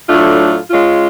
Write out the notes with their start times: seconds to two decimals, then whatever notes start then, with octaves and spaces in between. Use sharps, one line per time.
0.08 A2 F#3 A3 D4 F4
0.71 G#3 C#4 F4